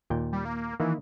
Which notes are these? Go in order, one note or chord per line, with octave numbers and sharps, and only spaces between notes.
D#2 A#2 G5
G3
A#3
D#3 E3 A#3 E4